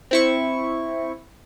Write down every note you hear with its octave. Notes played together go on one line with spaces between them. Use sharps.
C4 E4 C#6